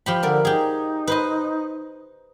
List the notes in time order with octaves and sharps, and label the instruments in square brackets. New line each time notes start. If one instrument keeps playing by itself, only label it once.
[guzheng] F3 G4 B5
[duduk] D3 [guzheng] A#4 D5
[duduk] D#4 [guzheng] G4 G#4
[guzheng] B4 C5 D#5